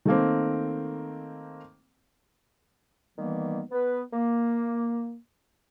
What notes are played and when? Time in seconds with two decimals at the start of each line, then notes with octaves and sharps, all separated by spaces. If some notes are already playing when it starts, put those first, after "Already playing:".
0.05 D#3 A3 A#3 C4
3.17 D#3 E3 G3 A#3 B3
3.71 B3 B4
4.13 A#3